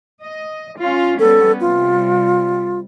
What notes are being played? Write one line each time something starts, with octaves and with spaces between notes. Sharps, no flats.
D#5
C#4 F4
G3 B3 C#4 A4
C3 G3 F4